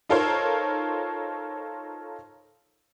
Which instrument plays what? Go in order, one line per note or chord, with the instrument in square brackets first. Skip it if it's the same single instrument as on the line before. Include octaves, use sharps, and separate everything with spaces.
[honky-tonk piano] D#4 F4 A4 A#4 C5 C#5